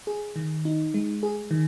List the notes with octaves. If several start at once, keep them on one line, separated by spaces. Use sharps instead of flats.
G#4
D#3
D#4
G#3
G#4
D#3